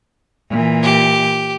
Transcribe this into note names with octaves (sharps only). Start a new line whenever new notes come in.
A#2 E3
G4